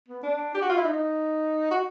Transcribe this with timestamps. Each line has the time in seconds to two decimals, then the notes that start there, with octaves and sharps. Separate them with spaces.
0.09 B3
0.23 D4
0.54 G4
0.62 F#4
0.70 F4
0.77 E4
0.84 D#4
1.71 F#4